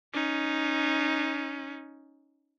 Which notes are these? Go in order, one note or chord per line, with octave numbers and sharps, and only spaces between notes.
C#4 D#4